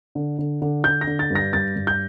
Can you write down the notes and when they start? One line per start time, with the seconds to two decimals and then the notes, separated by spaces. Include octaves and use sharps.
0.15 D3
0.38 D3
0.62 D3
0.84 D3 G6
1.01 A#6
1.07 D3
1.19 A6
1.30 G2
1.35 A#6
1.53 G2 A6
1.76 G2
1.87 G6